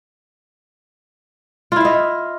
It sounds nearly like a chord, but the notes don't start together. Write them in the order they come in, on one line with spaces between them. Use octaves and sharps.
F4 E4 F5 D#5